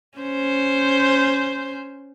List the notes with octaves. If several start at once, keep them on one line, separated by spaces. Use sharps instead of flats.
C#4 C5